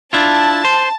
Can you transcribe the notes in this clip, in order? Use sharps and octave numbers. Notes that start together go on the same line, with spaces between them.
D4 E4 F4 A5
C5